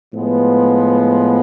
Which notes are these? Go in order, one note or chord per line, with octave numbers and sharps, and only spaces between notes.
A2 F3 G#3 B3